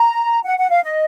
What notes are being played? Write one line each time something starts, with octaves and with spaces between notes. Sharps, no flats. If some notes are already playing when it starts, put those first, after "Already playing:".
Already playing: A#5
F#5
F#5
F5
D#5